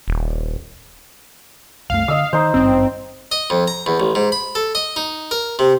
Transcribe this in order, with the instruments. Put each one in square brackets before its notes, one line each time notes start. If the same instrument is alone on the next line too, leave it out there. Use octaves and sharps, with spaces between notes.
[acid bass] D#1
[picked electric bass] C2 F#2 A3 [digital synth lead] F5
[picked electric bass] D3 [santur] D#5 E6
[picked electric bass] D#3 [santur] D#4 C5
[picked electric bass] G#1 G2 C#4 [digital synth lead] C4
[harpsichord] D#5
F2
A#5
E2
A1
G#2
B5
A4
D#5
D#4
A#4
C3